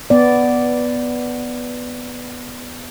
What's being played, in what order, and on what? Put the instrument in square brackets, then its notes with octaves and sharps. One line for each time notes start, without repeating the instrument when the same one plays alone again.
[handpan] B3 D5